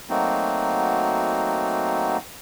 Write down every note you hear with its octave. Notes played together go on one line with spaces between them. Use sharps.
F#3 A3 A#3 C4 D#4 F#4